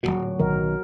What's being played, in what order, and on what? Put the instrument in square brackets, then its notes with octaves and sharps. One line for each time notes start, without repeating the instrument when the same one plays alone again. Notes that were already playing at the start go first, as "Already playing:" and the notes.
[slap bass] D1 G1 A#2 [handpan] F#3 F#4
[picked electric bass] B1 D#3 [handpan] A#4